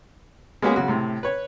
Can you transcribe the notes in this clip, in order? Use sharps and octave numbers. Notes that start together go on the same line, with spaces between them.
G#3 A#3 B3 C#4 G#4
C#3 F#3 F#4
A2 C3
B4 C#5